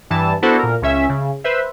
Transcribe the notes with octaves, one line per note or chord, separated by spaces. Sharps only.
G2 E3 A5
B3 D4 E4 F#4 A4 C5
A#2 A#4
C#2 C#4 E5
C#3
B4 C5 E5